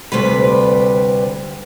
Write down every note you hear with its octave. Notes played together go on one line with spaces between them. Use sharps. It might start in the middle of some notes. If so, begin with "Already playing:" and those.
D2 C3 G3 B4